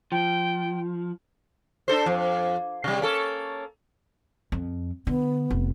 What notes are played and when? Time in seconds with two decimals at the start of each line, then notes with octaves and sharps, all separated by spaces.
0.12 F3 G5
1.88 D4 A4 C5
2.06 F2
2.84 C3 G3
3.01 A#3 C#4 A4
4.52 F2
5.07 D3 B3
5.50 F1